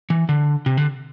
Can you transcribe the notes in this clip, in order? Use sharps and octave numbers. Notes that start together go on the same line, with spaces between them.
E3
D3
C3
D3